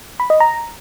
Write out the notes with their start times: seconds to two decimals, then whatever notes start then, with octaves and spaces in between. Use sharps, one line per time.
0.20 B5
0.30 D#5
0.40 A#5